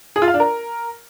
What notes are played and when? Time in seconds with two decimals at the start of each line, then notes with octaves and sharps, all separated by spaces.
0.16 G#4
0.22 F4
0.28 F5
0.34 D4
0.40 A#4